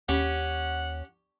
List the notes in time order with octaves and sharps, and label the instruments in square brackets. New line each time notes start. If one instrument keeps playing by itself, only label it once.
[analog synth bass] D#2 [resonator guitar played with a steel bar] C#4 [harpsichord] G4 [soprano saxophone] F#5